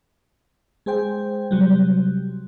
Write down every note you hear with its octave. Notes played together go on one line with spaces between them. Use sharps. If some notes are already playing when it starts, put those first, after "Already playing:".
G#3 G#4 C5 G5
C3 F#3 G3